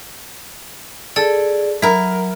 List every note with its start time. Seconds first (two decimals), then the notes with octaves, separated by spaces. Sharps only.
1.16 G#4 A4 D5
1.82 F#3 E4 A#4